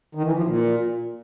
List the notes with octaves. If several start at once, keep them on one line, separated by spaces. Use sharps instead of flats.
D#3
E3
F3
A#2